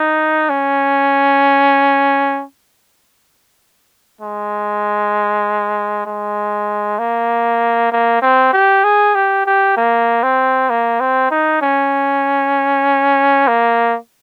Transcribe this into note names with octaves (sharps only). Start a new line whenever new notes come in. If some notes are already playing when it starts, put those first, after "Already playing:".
Already playing: D#4
C#4
G#3
G#3
A#3
A#3
C4
G4
G#4
G4
G4
A#3
C4
A#3
C4
D#4
C#4
A#3